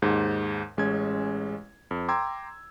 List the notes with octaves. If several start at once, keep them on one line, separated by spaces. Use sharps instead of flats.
D#2 G#2
A1 G#3 C#4 G#6
F2
G5 A#5 C6 D6 E6 G#6